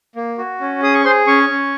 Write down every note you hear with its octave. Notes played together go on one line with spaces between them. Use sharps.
A#3
F#4
C#4
G#4 D#6
C#6
G#4 C5 C6
C#4 C#5 C#6
C#4